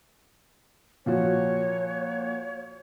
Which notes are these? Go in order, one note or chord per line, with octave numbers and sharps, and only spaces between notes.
A#2 F3 F#4 C#5